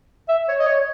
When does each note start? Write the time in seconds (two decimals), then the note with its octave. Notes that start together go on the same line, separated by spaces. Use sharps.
0.29 E5
0.48 C#5
0.59 D#5
0.66 C#5